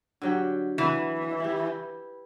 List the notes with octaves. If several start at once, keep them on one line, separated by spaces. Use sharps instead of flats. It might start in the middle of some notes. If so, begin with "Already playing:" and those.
D3 F#3 G4
E3 B4 F#5
E4 G4